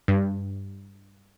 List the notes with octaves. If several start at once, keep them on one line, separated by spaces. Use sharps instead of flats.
G2